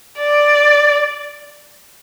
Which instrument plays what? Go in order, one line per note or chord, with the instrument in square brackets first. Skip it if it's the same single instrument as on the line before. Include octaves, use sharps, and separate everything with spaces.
[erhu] D5